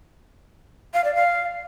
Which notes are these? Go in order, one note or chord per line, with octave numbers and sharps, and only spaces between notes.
F5
D5
F5